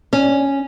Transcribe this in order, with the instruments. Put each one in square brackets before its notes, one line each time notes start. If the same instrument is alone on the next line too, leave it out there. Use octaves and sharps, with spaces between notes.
[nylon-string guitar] C#4